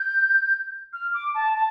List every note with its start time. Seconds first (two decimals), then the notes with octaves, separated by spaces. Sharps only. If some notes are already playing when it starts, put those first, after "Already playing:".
Already playing: G6
0.93 F6
1.14 D6
1.35 A5
1.55 A5